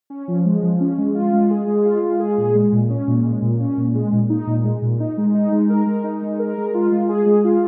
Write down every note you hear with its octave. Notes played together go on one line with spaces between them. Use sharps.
C#4
F3
G#3
F3
C#4
G#3
F4
G#3
G#4
G#3
F4
G#3
G#4
A#2
G#3
A#2
C#4
A#2
G#3
A#2
C#4
A#2
G#3
A#2
D#4
A#2
G#3
A#2
D#4
G#3
D#4
G#3
A#4
G#3
D#4
G#3
A#4
G#3
F4
G#3
G#4
G#3
F4